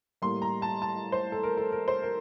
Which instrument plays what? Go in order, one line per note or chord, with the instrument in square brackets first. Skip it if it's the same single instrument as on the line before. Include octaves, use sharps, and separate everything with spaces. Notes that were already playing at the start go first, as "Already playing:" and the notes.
[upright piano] A2 G3 A#3 C6
A#5
A5
A5
C5
A4
A#4
A4
A#4
C5
A#4